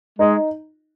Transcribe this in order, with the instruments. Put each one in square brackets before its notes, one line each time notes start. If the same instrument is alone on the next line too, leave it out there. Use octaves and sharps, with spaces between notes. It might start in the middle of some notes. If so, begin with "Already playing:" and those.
[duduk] G#3 [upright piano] D#4